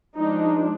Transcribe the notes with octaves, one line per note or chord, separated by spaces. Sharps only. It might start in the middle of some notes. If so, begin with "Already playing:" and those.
F3 G#3 D4 D#4